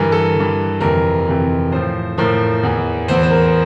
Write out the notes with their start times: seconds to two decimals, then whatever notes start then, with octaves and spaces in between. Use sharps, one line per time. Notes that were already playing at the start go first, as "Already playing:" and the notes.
Already playing: G2 E3 A#4
0.12 A4
0.35 G2 E3
0.81 F2 C3 E3 A#4
1.27 F2 C3 E3
1.72 A2 F3 C5
2.18 A2 F3 A#4
2.63 E2 E3
3.08 E2 E3 C5
3.23 C5
3.31 A#4